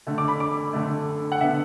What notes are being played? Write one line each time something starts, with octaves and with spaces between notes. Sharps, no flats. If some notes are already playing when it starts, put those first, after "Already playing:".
D3 A3
D6
B5
D6
D3 A3
F#5
D3 B3 E5